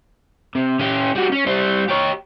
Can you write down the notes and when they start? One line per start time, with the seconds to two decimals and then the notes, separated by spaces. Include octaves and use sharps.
0.55 C3
0.79 C#4 G4
1.15 G3 F#4
1.32 C#4
1.47 G3 C5
1.88 G4 C#5